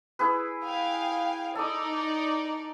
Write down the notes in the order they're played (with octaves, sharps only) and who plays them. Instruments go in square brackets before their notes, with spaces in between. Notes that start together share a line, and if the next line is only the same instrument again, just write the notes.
[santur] E4 G#4 B4
[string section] F5 G5 G#5
[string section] D#4 D5 [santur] A4 D#6